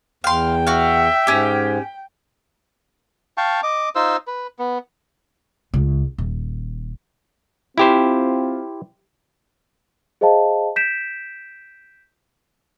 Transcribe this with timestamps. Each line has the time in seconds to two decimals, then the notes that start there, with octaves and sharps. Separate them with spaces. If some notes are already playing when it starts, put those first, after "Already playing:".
0.24 E2 F5 G5 C6
0.67 F#4 E5 F5
1.27 G#2 C#4 G4
3.37 F5 G5 A5 C#6
3.63 D#5 D6
3.95 D#4 F4 C5 E6
4.27 B4
4.59 B3
5.74 C#2
6.18 D#1
7.78 C4 E4 F4 G4 C5
10.21 G#4 C5 D#5 F5 A5
10.76 G6 B6 D7 E7